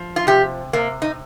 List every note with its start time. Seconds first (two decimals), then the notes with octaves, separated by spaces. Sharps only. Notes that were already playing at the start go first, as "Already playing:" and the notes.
Already playing: F3
0.16 F4
0.27 C3 G4
0.73 C3 A#3
1.02 D#4